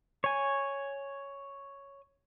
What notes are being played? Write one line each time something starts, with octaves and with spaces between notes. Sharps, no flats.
C#5 G#5